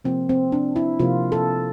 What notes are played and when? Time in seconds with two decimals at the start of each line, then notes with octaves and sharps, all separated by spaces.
0.05 C3 F3 A#3 C4
0.29 C4
0.52 D4
0.76 E4
0.99 C3 F3 A#3 F4
1.32 A4